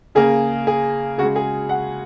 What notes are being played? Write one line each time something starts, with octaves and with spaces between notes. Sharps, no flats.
C#3 A#3 G#4
G#4
C#3 G#3 F#4
G#4
F#5